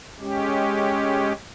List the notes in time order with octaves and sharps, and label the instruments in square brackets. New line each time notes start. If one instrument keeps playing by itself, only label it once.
[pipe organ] G#3 C#4 G4